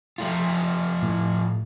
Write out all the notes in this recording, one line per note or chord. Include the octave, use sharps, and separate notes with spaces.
F3 A3 F4
A2